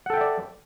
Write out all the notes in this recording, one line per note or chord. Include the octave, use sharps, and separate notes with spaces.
A4 D5 E5 F#5 G5